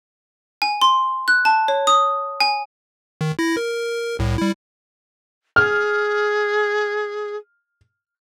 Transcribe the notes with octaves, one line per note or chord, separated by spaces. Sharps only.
G#5
C6
F#6
A5
C#5
D#6
G#5
D#3
E4 A#6
A#4
C2 A2
G3 E4
G#4 F6